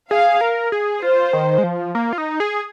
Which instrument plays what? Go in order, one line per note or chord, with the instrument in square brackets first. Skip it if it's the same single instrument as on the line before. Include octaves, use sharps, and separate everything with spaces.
[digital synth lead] G#4 [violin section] F5
[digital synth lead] A#4
G#4
[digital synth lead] F4 [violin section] C5
[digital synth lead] D#3
G#3
F3
A#3
F4
D#4
G#4